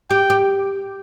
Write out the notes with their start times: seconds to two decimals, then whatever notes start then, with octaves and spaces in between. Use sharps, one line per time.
0.10 G4 G5
0.30 G4